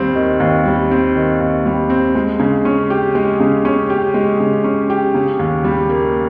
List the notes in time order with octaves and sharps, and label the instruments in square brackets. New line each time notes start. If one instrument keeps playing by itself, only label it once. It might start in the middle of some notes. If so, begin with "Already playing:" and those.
Already playing: [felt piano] D#2 G3 C4
D#3
D#2
G3
C4
D#3
D#2
G3
C4
G#3
C#3
C#4
G4
G#3
C#3
C#4
G4
G#3
C#3
C#4
G4
C#3
D#2
G3
A#3